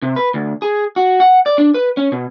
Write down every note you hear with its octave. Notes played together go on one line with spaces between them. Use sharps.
C3
B4
D2
G#4
F#4
F#5
D5
D4
B4
C#4
B2